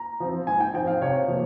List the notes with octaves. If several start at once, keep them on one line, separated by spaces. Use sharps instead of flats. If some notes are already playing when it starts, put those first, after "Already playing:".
Already playing: A#5
F3 C4
G#2 G#5
G5
F3 C4 G5
F5
C3 C#5
F3 A#3